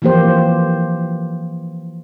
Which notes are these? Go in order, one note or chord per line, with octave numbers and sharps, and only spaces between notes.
E3 F3 A#3 G4 C5